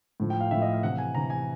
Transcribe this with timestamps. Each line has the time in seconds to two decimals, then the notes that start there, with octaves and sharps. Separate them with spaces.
0.20 A2 F3
0.30 G5
0.41 F5
0.51 A2 F3 E5
0.62 D#5
0.73 F5
0.83 C3 E3 F#5
0.98 G#5
1.15 C3 E3 A#5
1.30 G#5